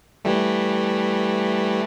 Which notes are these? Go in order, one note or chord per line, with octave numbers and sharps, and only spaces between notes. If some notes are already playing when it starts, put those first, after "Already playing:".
E3 G3 A3